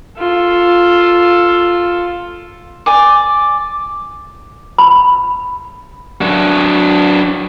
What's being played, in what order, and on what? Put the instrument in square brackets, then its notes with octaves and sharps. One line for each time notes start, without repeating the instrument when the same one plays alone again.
[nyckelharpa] F4 A4
[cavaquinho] D5 G#5 D6
[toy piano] B5
[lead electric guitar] F#3 D4